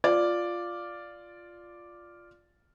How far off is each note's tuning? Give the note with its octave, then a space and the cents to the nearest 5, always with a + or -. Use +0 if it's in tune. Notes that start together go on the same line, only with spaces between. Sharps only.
F4 +0 D5 +0